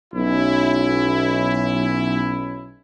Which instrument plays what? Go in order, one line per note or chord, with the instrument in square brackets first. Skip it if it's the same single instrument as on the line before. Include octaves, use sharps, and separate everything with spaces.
[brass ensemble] B1 C#4 E4